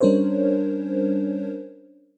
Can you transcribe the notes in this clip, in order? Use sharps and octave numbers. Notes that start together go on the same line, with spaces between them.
G3 C#4 D4 A#4 C5 C#5